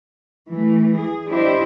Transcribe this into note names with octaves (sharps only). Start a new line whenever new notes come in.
E3 A3
G#4
D4 E4 G4 C5 D#5